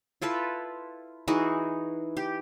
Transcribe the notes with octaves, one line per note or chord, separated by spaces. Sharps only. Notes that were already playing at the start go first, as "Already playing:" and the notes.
E4 F4 A4 B4
E3 D#4 F#4 G#4
G4